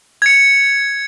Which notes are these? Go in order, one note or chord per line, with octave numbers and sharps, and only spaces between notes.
G#6 C#7